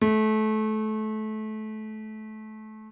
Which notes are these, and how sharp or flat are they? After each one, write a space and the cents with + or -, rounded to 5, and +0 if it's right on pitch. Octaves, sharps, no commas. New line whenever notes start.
A3 -25